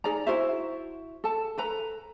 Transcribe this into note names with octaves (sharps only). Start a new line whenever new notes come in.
D#4 G#4 D5 A#5
E4 F#4 C5 E5
A4 A5
A4 B4 A#5